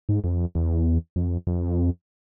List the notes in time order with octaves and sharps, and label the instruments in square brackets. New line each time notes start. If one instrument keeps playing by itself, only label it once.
[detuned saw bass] G#2
F2
E2
F2
F2